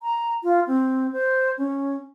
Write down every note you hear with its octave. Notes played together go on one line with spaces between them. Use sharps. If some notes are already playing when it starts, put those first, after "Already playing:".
A#5
F4
C4
C5
C#4